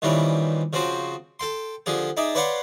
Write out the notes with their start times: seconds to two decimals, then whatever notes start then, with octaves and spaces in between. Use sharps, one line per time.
0.02 A#2 D#3 E3 G3 C4 C#4
0.73 C#3 F3 C4 F#4 C5
1.40 A4 G5 C6
1.86 D3 F3 G4 G#4
2.17 D#4 G#4 D5 E5
2.35 B4 C#5 D5 F5 F#5 C6